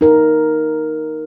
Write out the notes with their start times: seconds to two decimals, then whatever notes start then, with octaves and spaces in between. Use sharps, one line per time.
0.01 D#4 A#4